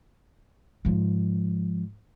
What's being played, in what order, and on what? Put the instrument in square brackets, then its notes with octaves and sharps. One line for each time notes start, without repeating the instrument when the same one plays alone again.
[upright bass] G#2 F3